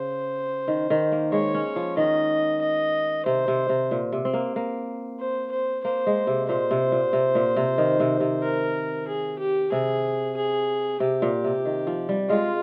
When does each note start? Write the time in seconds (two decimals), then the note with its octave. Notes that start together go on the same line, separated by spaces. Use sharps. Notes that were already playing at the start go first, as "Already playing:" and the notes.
Already playing: C#3 C5
0.68 D#3
0.90 D#3
1.12 A#3
1.32 G#3 C#5
1.54 C#4
1.76 F3
1.97 D#3 D#5
2.62 D#5
3.26 C3 C5
3.48 C3
3.69 C3
3.91 A#2
4.12 C3
4.25 C4
4.33 A#3
4.56 A#3
5.20 C5
5.52 C5
5.84 A#3 C5
6.07 G#3
6.27 C3
6.49 A#2 C5
6.71 C3
6.92 A#2
7.13 C3
7.35 A#2
7.56 C3
7.78 D#3
8.00 C3
8.20 C3
8.42 A#4
9.08 G#4
9.39 G4
9.72 C3 G#4
10.37 G#4
11.00 C3 G4
11.22 A#2
11.44 C3
11.65 D#3
11.87 F3
12.09 G3
12.29 G#3 F4